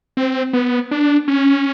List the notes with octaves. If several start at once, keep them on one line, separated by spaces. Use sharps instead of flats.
C4
B3
D4
C#4